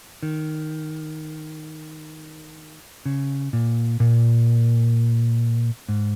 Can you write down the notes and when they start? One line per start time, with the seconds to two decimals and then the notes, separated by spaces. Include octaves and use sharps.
0.23 D#3
3.06 C#3
3.53 A#2
4.00 A#2
5.89 G#2